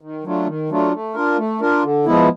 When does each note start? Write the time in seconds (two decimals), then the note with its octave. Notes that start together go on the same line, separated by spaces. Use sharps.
0.01 D#3
0.24 F#3 A3 D4 F4
0.47 D#3
0.70 F#3 A3 D4 F4
0.93 A3
1.15 D4 F4 A#4
1.38 A3
1.60 D4 F4 A#4
1.83 D3
2.05 F3 G#3 B3 E4